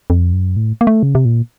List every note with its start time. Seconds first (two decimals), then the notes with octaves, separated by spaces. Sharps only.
0.10 F2
0.33 F#2
0.57 A2
0.81 A#3
0.87 A3
1.03 C#3
1.15 C3
1.25 A#2